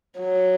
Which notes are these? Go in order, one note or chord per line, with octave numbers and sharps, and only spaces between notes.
F#3